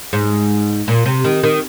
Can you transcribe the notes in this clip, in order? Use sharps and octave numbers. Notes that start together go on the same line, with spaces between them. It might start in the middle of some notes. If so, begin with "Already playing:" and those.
G#2
A#2
C3
D#3
D#3